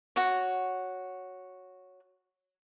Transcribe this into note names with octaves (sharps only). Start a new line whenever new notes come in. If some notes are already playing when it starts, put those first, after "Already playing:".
F#4 C#5